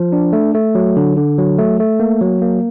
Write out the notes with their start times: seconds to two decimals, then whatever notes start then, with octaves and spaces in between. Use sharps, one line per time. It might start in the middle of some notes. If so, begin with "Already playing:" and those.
Already playing: F3
0.12 D4
0.33 A3
0.54 A3
0.75 F#3
0.96 D3
1.17 D3
1.38 F#3
1.58 A3
1.80 A3
2.00 A#3
2.21 F#3
2.42 A#3